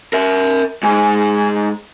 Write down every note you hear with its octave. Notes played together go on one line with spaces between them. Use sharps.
A#4 E5
G#2 G#4